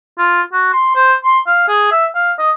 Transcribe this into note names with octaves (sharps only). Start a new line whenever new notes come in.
F4
F#4
C6
C5
C6
F5
G#4
E5
F5
D#5